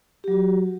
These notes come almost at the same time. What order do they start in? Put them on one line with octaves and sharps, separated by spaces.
G4 F#3 F#4